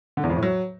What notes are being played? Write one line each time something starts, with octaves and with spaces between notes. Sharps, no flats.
D3
E2
F2
A2
F#3